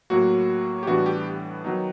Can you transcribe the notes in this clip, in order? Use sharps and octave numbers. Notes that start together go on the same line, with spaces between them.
A2 F#3 A#3 F#4
G4
A2 E3 G3 B3 D4 F#4
G4
D#3 F#3 B3 D#4